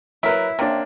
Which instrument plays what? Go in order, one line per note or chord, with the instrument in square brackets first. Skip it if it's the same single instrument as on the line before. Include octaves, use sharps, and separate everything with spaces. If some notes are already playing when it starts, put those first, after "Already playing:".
[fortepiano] F#3 A#4 B4 [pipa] E4
[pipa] C3 [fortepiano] A#3 C#4 D4